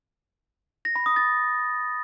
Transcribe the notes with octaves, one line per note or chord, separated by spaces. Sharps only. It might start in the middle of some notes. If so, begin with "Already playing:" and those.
A#6
B5
D#6
A6